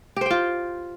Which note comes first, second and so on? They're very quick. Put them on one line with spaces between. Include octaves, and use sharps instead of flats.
G4 C5 G5 F4